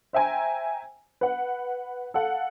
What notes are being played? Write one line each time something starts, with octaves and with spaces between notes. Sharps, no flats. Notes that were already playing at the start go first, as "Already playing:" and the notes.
C5 E5 G5 G#5 A#5
B4 F#5
A4 F5 F#5